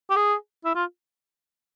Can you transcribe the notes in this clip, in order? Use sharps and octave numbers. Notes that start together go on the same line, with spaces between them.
G4
G#4
E4
F4